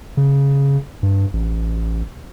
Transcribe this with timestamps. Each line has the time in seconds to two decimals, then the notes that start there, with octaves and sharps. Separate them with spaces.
0.17 C#3
1.03 G2
1.33 A1